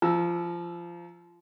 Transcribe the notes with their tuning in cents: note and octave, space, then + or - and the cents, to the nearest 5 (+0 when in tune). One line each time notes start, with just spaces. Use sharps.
F3 -20 A#5 +0 E6 +0